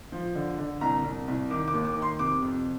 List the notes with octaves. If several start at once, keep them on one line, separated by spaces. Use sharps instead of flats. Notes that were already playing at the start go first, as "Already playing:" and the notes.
F3
D3
D3
C2 A#5
C2
C2
D#3 D6
D6
D#2
D6
D#3
C6
C3 D6
F2